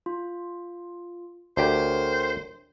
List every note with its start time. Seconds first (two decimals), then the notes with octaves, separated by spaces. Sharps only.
0.06 F4
1.57 D2 G4 A#4 C5 C#5 G5